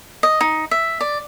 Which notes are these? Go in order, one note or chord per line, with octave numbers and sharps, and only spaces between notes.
D#5
D#4
E5
D5